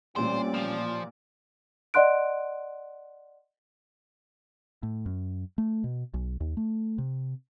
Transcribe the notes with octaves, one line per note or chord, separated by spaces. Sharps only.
A1 A#2 G3 C4 C#4 C5 D5
F3
D5 D#5 F#5 C6 F#6 D7
A2
F#2
A3
B2
B1
D#2
A3
C3